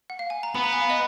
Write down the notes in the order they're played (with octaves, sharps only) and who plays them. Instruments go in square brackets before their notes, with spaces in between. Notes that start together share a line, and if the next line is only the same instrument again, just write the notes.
[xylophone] F#5
F5
G#5
A#5
[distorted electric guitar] B3 [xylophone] B5
[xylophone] A#5
G#5
F5
D#5